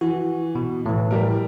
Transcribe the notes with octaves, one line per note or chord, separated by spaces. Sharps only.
E3 F#4
B2
A2 E3
G3 G4 A#4